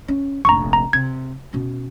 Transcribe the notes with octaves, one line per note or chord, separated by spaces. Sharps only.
C#4
F1 A#1 A#5 C#6
A#5
C3 G#6
B2 C#4